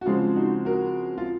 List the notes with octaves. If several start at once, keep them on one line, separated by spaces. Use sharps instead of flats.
F#4
C#3 F3 G#3 C4 F4
D#4 F#4
F#4 A#4
F4